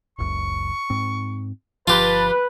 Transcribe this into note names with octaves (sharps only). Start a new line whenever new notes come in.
F#1 C#2 F#2 C#6
G#2 C4
G1 C#2 F3 F4 G4 B4 A5